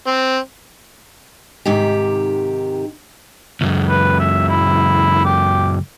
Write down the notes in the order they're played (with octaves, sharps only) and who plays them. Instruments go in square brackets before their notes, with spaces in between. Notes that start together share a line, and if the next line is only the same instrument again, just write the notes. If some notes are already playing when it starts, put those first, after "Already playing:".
[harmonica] C4
[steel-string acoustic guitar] G#2 C3 D#3 G4
[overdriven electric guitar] C#2 F#2
[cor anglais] B4
E5
E4
G4